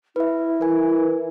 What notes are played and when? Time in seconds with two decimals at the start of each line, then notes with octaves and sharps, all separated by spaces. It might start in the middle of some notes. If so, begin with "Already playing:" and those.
0.16 E4 B4 E5
0.61 E3 A#4 G#5